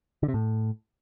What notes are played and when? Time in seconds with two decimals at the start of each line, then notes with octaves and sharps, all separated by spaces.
0.23 D3
0.28 C3
0.34 A2